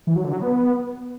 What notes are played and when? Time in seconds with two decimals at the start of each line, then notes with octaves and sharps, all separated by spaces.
0.07 E3
0.16 F#3
0.24 D3
0.33 F#3
0.42 B3